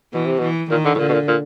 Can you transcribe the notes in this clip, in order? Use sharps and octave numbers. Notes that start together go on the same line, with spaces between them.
B2 E3
C3
B2 E3
A#2 D#3
D3
A2
A#2 D3
B2
A#2
A#2